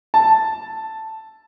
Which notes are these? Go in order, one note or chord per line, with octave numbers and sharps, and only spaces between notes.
A5